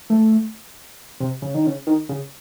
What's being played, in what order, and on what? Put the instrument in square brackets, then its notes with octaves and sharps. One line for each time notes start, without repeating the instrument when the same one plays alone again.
[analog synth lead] A3
C3
C#3
D#3
C#3
D#3
C#3